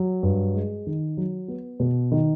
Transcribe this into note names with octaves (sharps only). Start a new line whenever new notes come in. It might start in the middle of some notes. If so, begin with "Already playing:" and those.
Already playing: F#3
G2
G#3
D#3
F#3
B3
B2
D#3